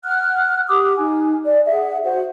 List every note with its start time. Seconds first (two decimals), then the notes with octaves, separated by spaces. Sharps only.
0.04 F#5 F6 F#6
0.68 G4 D6 D#6
0.99 D#4 G#5
1.44 D5
1.66 G#4 E5 F#5
2.03 F#4 C5 F#5